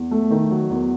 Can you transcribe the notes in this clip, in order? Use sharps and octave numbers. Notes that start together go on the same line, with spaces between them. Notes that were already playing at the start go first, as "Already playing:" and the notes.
Already playing: E2
A3
D#3
F#3
E2